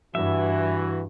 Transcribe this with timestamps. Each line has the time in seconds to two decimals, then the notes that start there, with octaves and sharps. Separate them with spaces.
0.15 G2 E3 F#4 E5